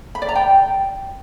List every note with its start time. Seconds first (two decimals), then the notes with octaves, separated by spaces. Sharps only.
0.15 B5
0.22 D5
0.29 A#5
0.35 G5